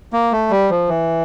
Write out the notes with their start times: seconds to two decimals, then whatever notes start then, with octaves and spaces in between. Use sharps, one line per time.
0.13 A#3
0.32 A3
0.50 G3
0.70 F3
0.89 E3